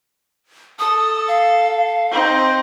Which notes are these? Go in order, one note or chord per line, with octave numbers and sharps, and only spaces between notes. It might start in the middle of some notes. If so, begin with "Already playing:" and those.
A4 D#6
F5
C4 D#4